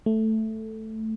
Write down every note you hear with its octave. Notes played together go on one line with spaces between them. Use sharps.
A3